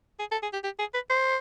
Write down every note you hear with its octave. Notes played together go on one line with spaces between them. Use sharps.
G#4
A4
G#4
G4
G4
G#4
B4
C5